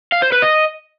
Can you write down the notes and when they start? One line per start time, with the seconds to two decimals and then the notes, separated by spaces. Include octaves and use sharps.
0.12 F5
0.22 C5
0.32 B4
0.42 D#5